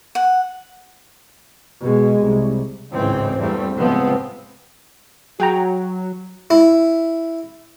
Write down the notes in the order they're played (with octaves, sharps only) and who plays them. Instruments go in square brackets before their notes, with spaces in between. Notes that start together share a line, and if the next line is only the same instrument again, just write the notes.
[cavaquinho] F#5
[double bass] B2 G#3
C2
[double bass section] G#1 C#2 A2 E3 C4
E2 G2 G3 A3 C4
C#2 A2 C3 F3 B3 C4
[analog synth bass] F#3 [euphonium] F#4 [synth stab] G#4 G5 A#5
[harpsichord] E4